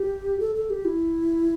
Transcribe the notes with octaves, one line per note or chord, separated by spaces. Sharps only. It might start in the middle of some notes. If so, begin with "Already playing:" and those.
Already playing: G4
A4
A4
G4
E4